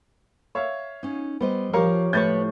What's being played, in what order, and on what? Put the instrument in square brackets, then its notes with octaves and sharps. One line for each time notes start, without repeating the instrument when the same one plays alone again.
[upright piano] C#5 E5 F5
[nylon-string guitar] C#4 D#4
[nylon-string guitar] G3 C5 D#5 [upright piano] B3
[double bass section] F3 [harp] G4 C#5 [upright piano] A#4 F5 A#5
[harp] A2 C#6 [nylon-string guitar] E4 B4 C#5 [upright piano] G6 A6